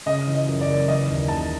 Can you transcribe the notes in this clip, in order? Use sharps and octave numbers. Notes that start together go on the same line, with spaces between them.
C#3 D#5
E3
D#5
F#2
D5
F#1
E3 D#5
D#2
C#3 A5